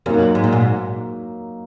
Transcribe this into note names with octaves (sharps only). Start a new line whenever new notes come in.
F#2 F#3 A#3 D#4
G#2
A#2
G#2